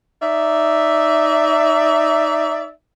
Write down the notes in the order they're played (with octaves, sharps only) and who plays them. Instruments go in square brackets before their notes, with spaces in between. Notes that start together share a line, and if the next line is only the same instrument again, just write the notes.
[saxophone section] D#4 D5 E5